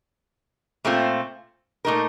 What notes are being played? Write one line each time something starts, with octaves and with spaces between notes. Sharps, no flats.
A#2 A3 C4 F4
A#2 A3 D#4 A#4